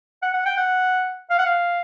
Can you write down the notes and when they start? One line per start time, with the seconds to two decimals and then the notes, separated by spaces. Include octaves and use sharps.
0.23 F#5
0.34 F#5
0.46 G5
0.58 F#5
1.30 F5
1.39 F#5
1.46 F5